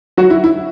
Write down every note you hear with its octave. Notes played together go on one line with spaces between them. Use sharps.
F#3 F#4
E4
E4